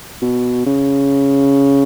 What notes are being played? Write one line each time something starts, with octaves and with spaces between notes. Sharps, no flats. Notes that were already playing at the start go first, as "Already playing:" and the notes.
B2
C#3